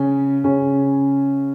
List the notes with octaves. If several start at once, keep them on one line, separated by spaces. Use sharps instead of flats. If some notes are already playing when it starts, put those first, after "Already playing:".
Already playing: C#3 C#4
C#3 C#4